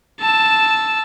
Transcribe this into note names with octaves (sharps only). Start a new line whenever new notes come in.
A5 E6